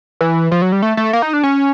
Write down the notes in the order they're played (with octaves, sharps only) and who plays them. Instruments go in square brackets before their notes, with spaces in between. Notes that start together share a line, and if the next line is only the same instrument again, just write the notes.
[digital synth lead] E3
F3
F#3
G3
A3
A3
A#3
D#4
D4
C#4